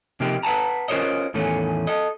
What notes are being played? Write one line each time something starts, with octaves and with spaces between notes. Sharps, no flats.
C3 F3 A#3 D#4 G4
B4 F#5 A5 A#5
C#4 F4 A#4 C5 C#5 D#5
E2 A2 D#3 E3 A3 C#4
A4 D#5